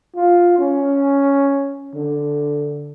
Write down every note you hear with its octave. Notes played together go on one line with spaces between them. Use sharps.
F4
C#4
D3